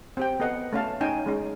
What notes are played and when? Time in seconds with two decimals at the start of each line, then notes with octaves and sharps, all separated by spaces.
0.17 C4 G4 G5
0.40 B3 A4 D#5 F#5
0.73 A3 C#4 F5 A5
1.01 C#4 D#4 G5 G#5
1.26 G#3 C#4 D#4